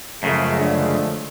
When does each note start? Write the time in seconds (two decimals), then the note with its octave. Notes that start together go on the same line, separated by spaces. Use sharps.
0.23 F#2 C#3 F3 G#3 A3
0.58 D3